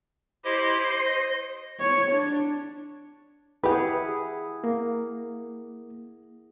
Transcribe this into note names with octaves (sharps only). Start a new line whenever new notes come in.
E4 G4 C5 D#5
D#5
C#5
D4
E4 G4 G#4 B4 F#5
A#3